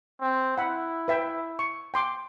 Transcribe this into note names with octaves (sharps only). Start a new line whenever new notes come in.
C4
E4 F#5 B5
B4 E5 G5
C#6
G5 C6 D6